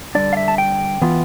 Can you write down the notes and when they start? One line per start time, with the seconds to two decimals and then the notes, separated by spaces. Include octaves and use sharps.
0.15 D3 G3 D4 D5
0.33 F5
0.37 E5
0.48 A5
0.58 G5
1.02 E3 B3 F4